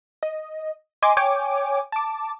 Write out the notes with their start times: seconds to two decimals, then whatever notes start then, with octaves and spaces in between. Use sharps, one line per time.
0.23 D#5
1.02 D#5 G#5 C6 D6
1.17 C#5 G5 G#5 D6
1.92 A5 D6